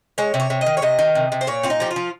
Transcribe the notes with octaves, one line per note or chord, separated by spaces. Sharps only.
G#3 C#5
C3
C#5
C3
D#5
D#3
C#5
C3 D#5
D#3
C3
C3
C5
A#2 C#5
C4 F4
D#4
F3 G4
F4
F3